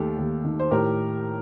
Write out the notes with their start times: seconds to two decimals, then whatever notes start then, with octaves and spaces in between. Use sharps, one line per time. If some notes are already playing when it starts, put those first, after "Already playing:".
Already playing: D#2 D#3 A3 G4 A4
0.18 D#2
0.44 D#3
0.59 C5
0.71 A2 G4 A#4